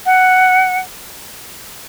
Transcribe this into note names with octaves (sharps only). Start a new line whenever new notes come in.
F#5